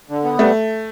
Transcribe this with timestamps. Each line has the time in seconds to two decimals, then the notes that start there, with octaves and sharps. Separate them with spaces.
0.09 D3
0.24 B3
0.39 G3 A3